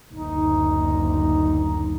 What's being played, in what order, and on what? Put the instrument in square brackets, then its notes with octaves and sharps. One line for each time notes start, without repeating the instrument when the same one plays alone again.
[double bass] F#1 D2 [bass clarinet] D#4